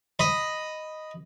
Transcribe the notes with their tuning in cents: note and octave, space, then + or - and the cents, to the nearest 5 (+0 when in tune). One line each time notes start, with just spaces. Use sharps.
D#5 +0 B5 +0